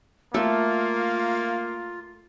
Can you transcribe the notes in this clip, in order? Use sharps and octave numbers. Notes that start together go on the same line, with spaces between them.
A3 A#3 F4 A4